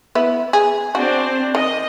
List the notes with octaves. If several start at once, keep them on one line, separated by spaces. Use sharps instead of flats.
B3 E4
G#4
C4 D4 F#4 C5
D#3 D#5